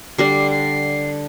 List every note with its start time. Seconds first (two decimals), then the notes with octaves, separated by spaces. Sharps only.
0.18 D3 G3 D4 C7
0.51 C7